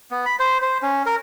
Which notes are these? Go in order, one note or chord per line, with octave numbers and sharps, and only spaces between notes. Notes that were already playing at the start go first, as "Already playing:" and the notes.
B3
B5
C5
C5
C#4
A#4